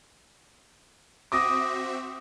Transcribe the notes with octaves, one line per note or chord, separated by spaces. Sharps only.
C4 F#4 E5 D6 D#6 A#6